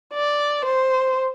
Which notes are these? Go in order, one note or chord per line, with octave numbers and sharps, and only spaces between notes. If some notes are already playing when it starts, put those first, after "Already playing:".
D5
C5